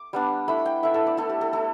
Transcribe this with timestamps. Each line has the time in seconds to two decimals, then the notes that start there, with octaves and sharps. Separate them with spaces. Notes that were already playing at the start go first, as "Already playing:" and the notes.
Already playing: D6
0.13 G3 B3 D4
0.48 A3 E4 B5
0.66 G5
0.83 A3 E4 E5
0.94 A4
1.07 D5
1.17 A3 E4 A4
1.29 G4
1.41 A4
1.53 A3 E4 A4